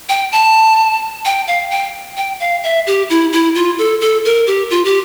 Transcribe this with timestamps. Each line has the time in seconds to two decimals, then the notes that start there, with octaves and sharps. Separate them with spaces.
0.09 G5
0.32 A5
1.25 G5
1.48 F5
1.71 G5
2.17 G5
2.40 F5
2.64 E5
2.87 G4
3.10 E4
3.33 E4
3.55 F4
3.78 A4
4.01 A4
4.25 A#4
4.47 G4
4.70 F4
4.85 G4